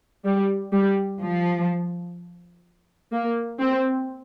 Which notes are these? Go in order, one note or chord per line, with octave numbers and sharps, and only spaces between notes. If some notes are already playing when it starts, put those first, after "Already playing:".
G3
G3
F3
A#3
C4